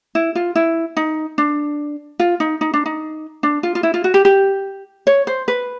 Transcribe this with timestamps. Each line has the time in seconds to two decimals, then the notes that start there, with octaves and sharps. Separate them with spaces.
0.15 E4
0.35 F4
0.56 E4
0.97 D#4
1.38 D4
2.19 F4
2.40 D#4
2.61 D#4
2.74 D4
2.86 D#4
3.43 D4
3.63 F4
3.75 F4
3.83 E4
3.94 F4
4.04 F#4
4.14 G4
4.25 G4
5.07 C#5
5.27 C5
5.48 B4